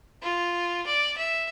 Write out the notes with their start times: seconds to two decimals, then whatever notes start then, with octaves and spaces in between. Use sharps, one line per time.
0.22 F4
0.86 D5
1.17 E5